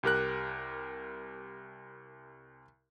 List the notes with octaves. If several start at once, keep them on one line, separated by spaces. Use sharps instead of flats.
C2 G4 A#4 F#6